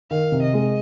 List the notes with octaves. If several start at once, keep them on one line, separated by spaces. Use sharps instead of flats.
D#3 F5
C3
D#5
G#3